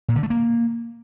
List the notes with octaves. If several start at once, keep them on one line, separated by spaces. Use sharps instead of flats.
A#2
D3
A3
A#3